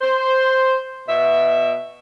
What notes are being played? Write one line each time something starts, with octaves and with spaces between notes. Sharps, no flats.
C5
B2 E5